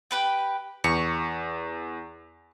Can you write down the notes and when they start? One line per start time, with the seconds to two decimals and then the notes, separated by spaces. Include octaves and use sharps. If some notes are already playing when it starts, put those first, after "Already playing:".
0.11 G4 B4 G5
0.84 E2 C#6